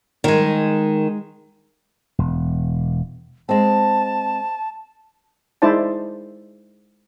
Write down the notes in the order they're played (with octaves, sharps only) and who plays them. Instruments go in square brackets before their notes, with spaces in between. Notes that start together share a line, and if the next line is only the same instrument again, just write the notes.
[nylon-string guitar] D#3 [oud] G#3 A#4
[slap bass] E1
[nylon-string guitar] G#3 C4 [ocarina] A5
[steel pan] G#3 D#4 E4 C5 D5 A5